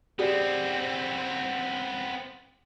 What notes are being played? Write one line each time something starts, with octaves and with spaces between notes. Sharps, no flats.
B3 C4 G4 G#4 D5